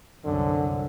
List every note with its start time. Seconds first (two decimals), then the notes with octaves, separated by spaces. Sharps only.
0.24 C2 F#2 D3